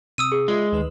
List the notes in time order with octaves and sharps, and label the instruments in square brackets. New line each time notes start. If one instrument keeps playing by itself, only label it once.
[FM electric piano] C3 [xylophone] D#6 E6 D#7
[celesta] G#4
[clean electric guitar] G#3 [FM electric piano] F4 D5 E5
[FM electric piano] D2 D#3 B4